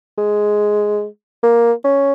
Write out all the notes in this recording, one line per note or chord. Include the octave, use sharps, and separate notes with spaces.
G#3
A#3
C#4